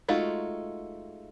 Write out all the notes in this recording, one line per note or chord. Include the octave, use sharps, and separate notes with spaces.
G#3 A3 D#4 F4 F#4